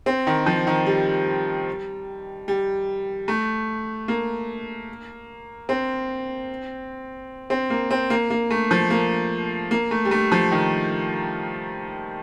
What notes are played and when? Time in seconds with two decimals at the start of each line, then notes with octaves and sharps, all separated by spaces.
0.06 C4
0.27 D#3
0.46 F3
0.67 D#3
0.86 G3
2.48 G3
3.28 A3
4.08 A#3
5.69 C4
7.50 C4
7.70 A#3
7.91 C4
8.10 A#3
8.30 A#3
8.51 A3
8.71 F3
8.90 A#3
9.71 A#3
9.91 A3
10.05 G3
10.11 A3
10.32 F3
10.52 D#3